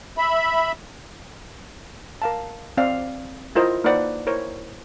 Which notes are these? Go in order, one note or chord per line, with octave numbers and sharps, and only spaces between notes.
E5 B5
A#4 F5 A5
C4 D5 F5
E4 F4 A#4 C5 D#5
A#3 D#4 B4 C5 D5 F#5
E4 A#4 C5 C#5